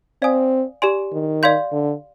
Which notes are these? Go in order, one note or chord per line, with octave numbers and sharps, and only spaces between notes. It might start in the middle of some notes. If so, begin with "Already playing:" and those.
C4 D5 F5 G#5 D#6
G4 D5 G#5 C6
D#3
D5 F5 C6 G6
D3